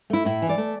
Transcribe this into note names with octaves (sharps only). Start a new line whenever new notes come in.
A3 E4
A2 E4
E3
D5
A3